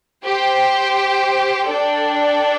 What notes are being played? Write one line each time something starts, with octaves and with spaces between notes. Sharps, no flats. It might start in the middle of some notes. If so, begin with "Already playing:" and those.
G4 C5 G5
D4 A4 D5 G5